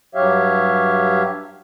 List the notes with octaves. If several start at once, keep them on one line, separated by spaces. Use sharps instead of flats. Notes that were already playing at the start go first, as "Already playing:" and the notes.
G2 F#3 G4 C#5 E5 F5